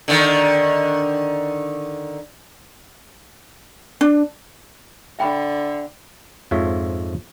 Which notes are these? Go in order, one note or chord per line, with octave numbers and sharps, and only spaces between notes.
D3 D#3
D4
D3 E5 G5 B5
F2 G#2 F3 F4 C#5 E5